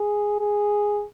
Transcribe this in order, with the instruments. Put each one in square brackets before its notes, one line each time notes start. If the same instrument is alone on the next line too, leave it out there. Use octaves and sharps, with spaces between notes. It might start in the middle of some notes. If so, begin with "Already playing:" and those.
Already playing: [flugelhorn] G#4
G#4